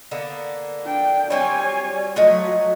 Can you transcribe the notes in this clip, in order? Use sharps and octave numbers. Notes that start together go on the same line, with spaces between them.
D3 A#3 B3
D4 G5
F#3 G3 C4 C#5 G#5
F#3 A3 F4 F#4 D#5